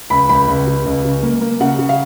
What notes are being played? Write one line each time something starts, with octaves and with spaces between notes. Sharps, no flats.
C#2 B5
C#2 B5
C#2
C#3
C#2
C#3
A#3
A#3
C#3 F#5
C#3
F5